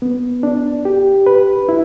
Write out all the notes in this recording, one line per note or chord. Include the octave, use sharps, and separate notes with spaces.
B3
D4
G4
B4
E4